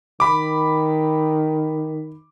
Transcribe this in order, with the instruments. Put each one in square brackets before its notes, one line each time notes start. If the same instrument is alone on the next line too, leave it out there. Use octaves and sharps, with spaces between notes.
[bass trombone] D#3 [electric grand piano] B5 D6